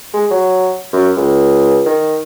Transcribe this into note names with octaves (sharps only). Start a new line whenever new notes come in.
G#3
F#3
F#2
C#2
D#3